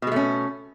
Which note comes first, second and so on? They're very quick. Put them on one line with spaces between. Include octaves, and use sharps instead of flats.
B2 G#3 A3 C#4